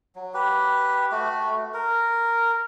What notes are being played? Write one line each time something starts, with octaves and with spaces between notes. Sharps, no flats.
F#3
G4 B4
A3 F#4
A#4